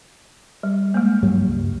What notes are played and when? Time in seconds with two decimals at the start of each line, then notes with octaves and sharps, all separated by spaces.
0.63 G3
0.94 G#3 A#3
1.23 G2 F#3 G3
1.47 C#2 G2